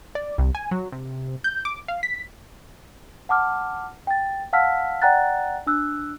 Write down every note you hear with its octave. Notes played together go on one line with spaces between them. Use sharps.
D5
C2
G#5
F#3
C3
G6
D6
F5
B6
F#5 A5 D6 F6
G5 A6
F5 F#5 A5 E6 F6 B6
D5 F#5 G5 A#5 F#6 A6
D4 E6 F#6